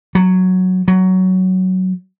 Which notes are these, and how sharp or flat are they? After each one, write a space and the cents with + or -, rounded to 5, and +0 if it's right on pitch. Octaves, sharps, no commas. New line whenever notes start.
F#3 +0
F#3 +10